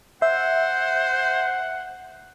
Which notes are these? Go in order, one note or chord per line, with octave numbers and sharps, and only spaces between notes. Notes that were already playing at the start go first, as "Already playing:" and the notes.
C5 E5 F#5